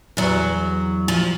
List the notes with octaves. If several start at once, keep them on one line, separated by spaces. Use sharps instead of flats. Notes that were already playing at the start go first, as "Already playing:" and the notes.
E2 F#3
F3